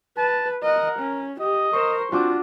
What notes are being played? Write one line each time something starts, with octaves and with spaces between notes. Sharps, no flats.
B4 A5
A#4 D#5 F#5
C#4
G4 D#5
A#4 C5 C#6 E7
C4 D4 F4 F#4 D6